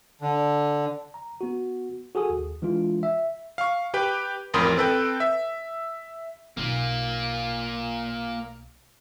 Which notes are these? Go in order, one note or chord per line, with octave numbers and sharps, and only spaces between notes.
D3
A#5
B3 F#4
F#4 G#4 A4 G#5 D#6
D#2
E3 G#3 D4 F4
E5
F5 C#6
G4 B4 G5
A1 F2 A#4 B5 C6 D#6
C4 A4 B4 G5
E5
B1 A#3 F4